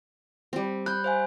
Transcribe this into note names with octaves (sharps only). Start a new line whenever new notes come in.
G3 C4
B5 F#6 G6
C5 F5 G#5